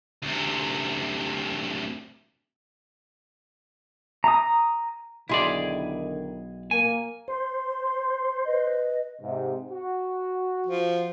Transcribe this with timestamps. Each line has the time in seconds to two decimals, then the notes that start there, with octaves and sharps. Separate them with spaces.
0.22 D2 C3
4.24 A#5 D#6
5.29 B1 D3 D#3 E4 G#4 D5 C6
6.71 A#3 G#5
7.28 C5 C6
8.45 B4 D#5
9.22 G#2 C3
9.72 F#4
10.67 F3